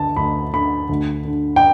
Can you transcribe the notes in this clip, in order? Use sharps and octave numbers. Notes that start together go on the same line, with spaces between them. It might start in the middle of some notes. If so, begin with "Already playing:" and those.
Already playing: D2 D3 A5
D2 B5
D3 B5
D2
D3
G5